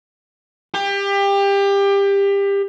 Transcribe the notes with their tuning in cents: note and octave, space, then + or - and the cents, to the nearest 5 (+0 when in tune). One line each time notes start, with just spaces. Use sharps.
G4 +25